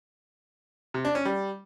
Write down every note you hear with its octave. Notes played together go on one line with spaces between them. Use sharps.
C3
D4
C#4
G3